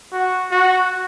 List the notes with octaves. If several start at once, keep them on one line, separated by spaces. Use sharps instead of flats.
F#4
F#4